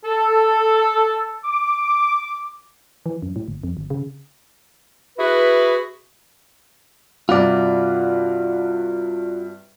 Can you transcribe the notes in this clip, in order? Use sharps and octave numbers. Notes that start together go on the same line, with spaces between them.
A4
D6
E3
F#2
A2
G1
F2
G1
C#3
E4 F#4 G#4 B4
G2 C3 F4 F#4 D5